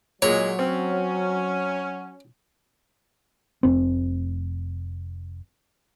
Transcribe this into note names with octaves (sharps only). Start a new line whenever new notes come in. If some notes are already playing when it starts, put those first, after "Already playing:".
A#2 F#3 G#3 C#5
C4 C#4
F1 C4